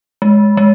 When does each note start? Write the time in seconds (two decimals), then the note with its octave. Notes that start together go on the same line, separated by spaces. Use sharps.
0.22 G#3
0.57 G#3